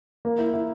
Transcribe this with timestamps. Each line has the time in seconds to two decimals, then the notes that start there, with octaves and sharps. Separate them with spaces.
0.25 A#3
0.38 E4
0.54 E4